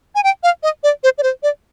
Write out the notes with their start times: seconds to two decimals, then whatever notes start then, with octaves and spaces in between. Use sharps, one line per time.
0.15 G#5
0.24 G5
0.43 F5
0.63 D#5
0.83 D5
1.04 C5
1.18 D5
1.23 C5
1.43 D5